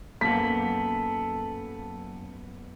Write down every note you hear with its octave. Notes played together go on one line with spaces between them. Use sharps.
F#2 A#3 B3 A4 B6